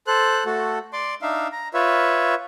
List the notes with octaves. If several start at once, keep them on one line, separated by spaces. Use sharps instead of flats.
A4 C5 F#6
A3 F#4 A4
D5 C6 D6
D4 D#4 E5 F5
A#5
F4 B4 C#5 E5